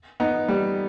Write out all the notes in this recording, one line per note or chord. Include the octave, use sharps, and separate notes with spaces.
B3 D#4
G3